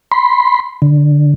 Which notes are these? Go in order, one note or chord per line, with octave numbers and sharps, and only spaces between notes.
B5 C6
D3